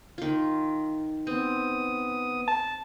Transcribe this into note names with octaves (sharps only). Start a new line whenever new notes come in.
D#3 F4
B3 C4 D#6
A5